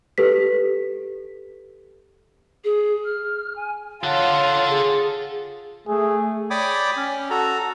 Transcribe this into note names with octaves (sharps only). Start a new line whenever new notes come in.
G4 A4 B4 B6
G#4
F6
G#5
F4 A4 C#5 F#5
G#4
A3 G#4
C#5 D5 G5 B5 D6 D#6
C#4
F#4 A4 A#5